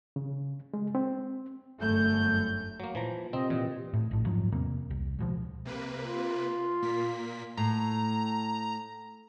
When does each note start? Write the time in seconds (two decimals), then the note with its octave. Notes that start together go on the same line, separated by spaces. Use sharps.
0.16 C#3
0.74 G#3
0.95 C4
1.80 G1 F#2 A3 G6
2.80 F#3 A#3
2.95 A#2 E3 F3 A#5
3.33 C3 C4 D#5
3.50 A#2 E3
3.93 A2
4.11 A#1 A2
4.26 F2 G#2 F3 F#3
4.52 E2 C3 A#3
4.90 C2
5.19 C#2 B2 F3
5.65 C3 A#3 B4
6.04 F4
6.82 A#2 A#3 B6
7.57 A2 A#5